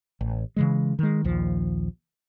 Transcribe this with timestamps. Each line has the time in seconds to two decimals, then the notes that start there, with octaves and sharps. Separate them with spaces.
0.21 A1
0.56 C#3 E3 G#3
0.99 D#3 G#3
1.24 A#1 D#2 F3